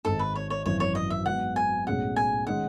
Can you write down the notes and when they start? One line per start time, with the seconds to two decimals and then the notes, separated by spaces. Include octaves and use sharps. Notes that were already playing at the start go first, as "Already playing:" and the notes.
0.05 G#1 G#2 D#3 A4
0.19 B4
0.35 C#5
0.50 C#5
0.66 G#1 F#2 E3 C#5
0.80 C#5
0.95 D#5
1.10 E5
1.26 G#2 F#3 B3 F#5
1.56 G#5
1.87 B1 A2 G#3 C#4 G#4 F#5
2.16 G#5
2.47 D#3 G#3 C#4 F#5